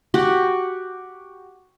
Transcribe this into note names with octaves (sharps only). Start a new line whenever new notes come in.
F#4 G4 F#5